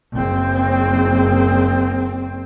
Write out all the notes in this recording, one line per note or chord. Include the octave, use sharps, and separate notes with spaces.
F#1 C4